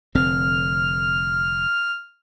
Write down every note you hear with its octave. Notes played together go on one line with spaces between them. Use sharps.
F1 D3 C4 F6